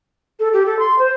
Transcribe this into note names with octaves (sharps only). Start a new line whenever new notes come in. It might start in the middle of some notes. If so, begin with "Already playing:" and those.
A4
G4
A4
C6
C5